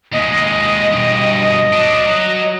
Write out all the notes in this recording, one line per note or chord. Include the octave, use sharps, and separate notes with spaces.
D#2 G#3 D#5
G2 B2
F#3 D4
F#3